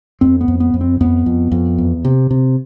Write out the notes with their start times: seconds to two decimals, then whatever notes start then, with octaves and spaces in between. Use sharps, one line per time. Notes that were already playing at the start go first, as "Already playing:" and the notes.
0.21 F2 C4
0.41 B3
0.48 F2
0.60 B3
0.74 F2
0.81 C4
1.01 F2 B3
1.26 F2
1.52 F2
1.78 E2
2.05 C3
2.31 C3